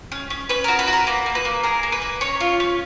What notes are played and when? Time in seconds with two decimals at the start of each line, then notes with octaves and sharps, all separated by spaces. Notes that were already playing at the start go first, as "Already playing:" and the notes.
0.12 C#4
0.30 C#4
0.49 C#4 B4
0.64 F#4 A#4
0.79 B4
0.87 F#4
0.93 A#4
1.07 A#3 B4
1.26 A#3
1.35 B4
1.45 A#3
1.63 G#4 A#4
1.83 A#3
1.92 B4
2.02 A#3
2.21 C#4 C#5
2.40 F4
2.60 C#4